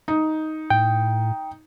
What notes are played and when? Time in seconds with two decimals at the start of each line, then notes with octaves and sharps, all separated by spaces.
0.08 D#4
0.70 A2 G5